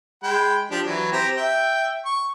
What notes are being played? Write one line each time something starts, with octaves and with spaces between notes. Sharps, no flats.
G#3 G5 B5
F3 D4 G4
E3 F#3
C4 G4 A#5
E5 G5
C#6